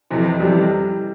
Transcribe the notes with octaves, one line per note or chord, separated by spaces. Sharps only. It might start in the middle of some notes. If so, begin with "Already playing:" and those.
F2 C3 E3
F2 C3 E3 G3